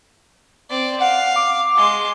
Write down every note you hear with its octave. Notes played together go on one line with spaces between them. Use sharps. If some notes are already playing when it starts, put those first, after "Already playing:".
C4 D5
F5 F#5
D6
G#3 C6